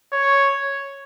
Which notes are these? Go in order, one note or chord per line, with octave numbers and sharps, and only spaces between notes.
C#5